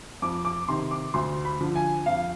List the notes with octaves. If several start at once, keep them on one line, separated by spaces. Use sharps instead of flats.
F2 D6
D6
C3 D#3 C6
D6
D2 C6
B5
D3 F3
G#5
F2 F5